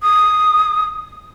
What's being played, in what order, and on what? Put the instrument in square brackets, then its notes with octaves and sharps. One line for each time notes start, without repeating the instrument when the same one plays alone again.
[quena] D#6